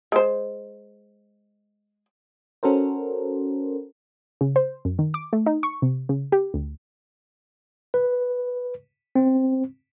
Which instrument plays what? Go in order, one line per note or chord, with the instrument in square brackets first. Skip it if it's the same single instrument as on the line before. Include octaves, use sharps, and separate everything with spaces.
[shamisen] G#3 C5
[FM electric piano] C#4 F#4 A4 A#4 C5
[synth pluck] C#3
C5
F#2
D#3
D6
A3
D#4
C#6
C3
C#3
G4
D2
[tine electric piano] B4
C4